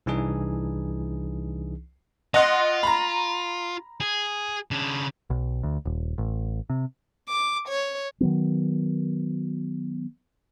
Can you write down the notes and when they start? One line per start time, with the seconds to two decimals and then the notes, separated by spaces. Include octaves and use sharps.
0.06 C2 E3 D4 D#4 G#4
2.34 F4 D#5 F#5 C6
2.83 A#5 B5
4.00 G#4
4.71 C#3 D4
5.30 B1
5.63 D2
5.85 D#1
6.18 A1
6.70 C3
7.28 D6
7.68 C#5
8.20 D#3 F#3 B3